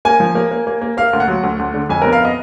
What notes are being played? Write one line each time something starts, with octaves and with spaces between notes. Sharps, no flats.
A#3 G#5
F3
A#3
A#3
A#3
A#3
A#3 F5
D2
F#5
F#3
D2
D2
D3
F2 G#5
B3 A#4
F5
B3 D#5